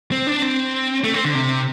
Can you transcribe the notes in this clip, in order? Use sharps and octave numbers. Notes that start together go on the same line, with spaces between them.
C4
D4
C4
A3
C4
D3
C3